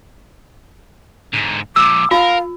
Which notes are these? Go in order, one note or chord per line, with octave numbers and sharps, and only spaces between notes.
G#2 D3
F2 A#2 D6 E6
F4 A#4 F5